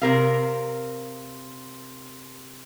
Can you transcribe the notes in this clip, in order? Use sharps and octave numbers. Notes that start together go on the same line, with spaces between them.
C3 A#4 F5